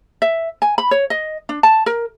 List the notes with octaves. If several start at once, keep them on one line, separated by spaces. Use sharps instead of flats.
E5
G#5
B5
C#5
D#5
D4
A5
A#4